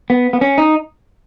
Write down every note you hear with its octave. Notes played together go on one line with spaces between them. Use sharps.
B3
B3
C#4
D#4